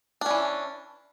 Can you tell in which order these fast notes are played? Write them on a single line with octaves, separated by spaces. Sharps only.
D4 C#4 E3